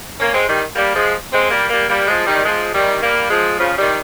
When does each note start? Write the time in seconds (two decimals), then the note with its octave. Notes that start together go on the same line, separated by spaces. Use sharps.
0.19 A#3 C#4
0.33 G#3 C4
0.47 D#3 G3
0.75 G3 A#3
0.94 F3 G#3
1.32 G#3 C4
1.51 G3 A#3
1.69 G3 A#3
1.88 G3 A#3
2.07 F3 G#3
2.26 D#3 G3
2.45 F3 G#3
2.73 D#3 G3
3.01 G3 A#3
3.30 F3 G#3
3.58 C#3 F3
3.78 D#3 G3